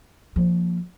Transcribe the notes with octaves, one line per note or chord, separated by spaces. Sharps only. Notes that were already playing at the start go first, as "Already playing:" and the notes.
F3 A#3